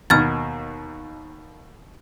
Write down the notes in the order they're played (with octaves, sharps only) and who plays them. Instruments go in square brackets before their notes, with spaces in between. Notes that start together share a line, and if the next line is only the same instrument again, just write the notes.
[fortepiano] D#2 B2 D#3 [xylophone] F6 G#6 A6